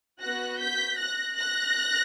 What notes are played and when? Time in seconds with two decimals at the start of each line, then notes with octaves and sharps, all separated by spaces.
0.21 B3 F#4 F#6 A#6
0.60 G6 B6
0.98 F#6 A#6
1.37 F#6 A#6